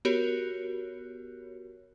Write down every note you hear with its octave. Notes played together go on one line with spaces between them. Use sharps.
B3 F#4 G4 A#4 C#5